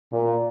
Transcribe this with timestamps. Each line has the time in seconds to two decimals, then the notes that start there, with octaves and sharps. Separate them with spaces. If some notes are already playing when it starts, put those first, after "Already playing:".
0.12 A#2